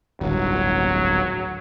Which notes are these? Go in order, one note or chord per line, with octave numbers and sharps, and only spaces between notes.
D1 G#1 G2 F#3